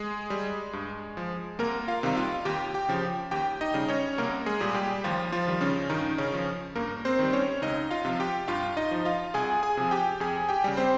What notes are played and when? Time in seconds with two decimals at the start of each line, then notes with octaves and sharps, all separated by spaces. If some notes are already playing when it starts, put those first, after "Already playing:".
Already playing: G#3 G#4
0.30 G3
0.73 G2
1.17 F3
1.59 C2 A#3 A#4
1.88 F4 F5
2.03 C3 D#3 G3
2.17 F4 F5
2.45 D#2 G4 G5
2.74 G4 G5
2.89 C#3 F3
3.31 D#2 G4 G5
3.61 D#4 D#5
3.74 C#3 G3
3.88 C#4 C#5
4.18 C2 A#3 A#4
4.46 G#3 G#4
4.60 A#2 G3
4.75 G3 G4
5.04 D#2 F3 F4
5.32 F3 F4
5.47 D#3 G3
5.61 C#3 C#4
5.89 G2 D#3 D#4
6.18 C#3 C#4
6.34 F3
6.75 G2 A#3 A#4
7.05 C4 C5
7.19 D#3 G3
7.33 C#4 C#5
7.62 C#2 D#4 D#5
7.91 F4 F5
8.05 C3 F3
8.20 G4 G5
8.48 G2 F4 F5
8.77 D#4 D#5
8.91 F3
9.05 F4 F5
9.34 C2 G#4 G#5
9.63 G#4 G#5
9.77 C3 F3
9.91 G4 G5
10.20 F2 G#4 G#5
10.49 G4 G5
10.64 C#3 G3
10.77 C4 C5